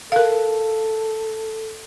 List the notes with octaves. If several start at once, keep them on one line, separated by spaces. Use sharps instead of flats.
A4 A#4 F5